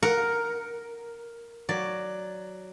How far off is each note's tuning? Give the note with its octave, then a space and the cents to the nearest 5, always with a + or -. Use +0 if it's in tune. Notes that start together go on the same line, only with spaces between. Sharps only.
A#4 +0 F#5 +0
F#3 +5 D5 +0